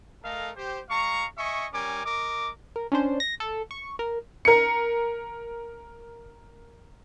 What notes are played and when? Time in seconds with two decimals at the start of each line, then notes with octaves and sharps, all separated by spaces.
0.23 A3 A4 A#4 D#5 F5
0.56 G4 C5
0.90 G#3 F5 A#5 C#6
1.37 D#5 E5 G#5 C#6
1.72 G3 C#4 A#4 G#5 D6
2.05 A#4 D#5 D6
2.76 A#4
2.92 C#4 D4 C5
3.20 A#6
3.40 A4
3.71 C#6
3.99 A#4
4.45 A#4 C#7